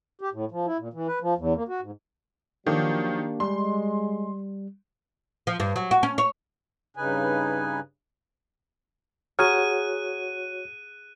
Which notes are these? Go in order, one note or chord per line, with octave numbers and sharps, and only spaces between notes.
G4
A2
F3
E4
A#2
E3
B4
F3
E2
A#3
F#4
G#2
D#3 F3 F#3 A#3 D4 G4
G3 G#3 C6
F3
G2
F#3
F#4
C#4
C#5
G2 C#3 D#4 B4 G#5
F#4 G#4 C#5 F#5 A#5 F6 F#6 D#7